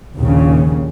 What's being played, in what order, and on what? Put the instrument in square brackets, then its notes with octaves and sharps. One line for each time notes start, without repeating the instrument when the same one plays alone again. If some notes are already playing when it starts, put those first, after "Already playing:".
[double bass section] A#1 D#2 A#2 C#3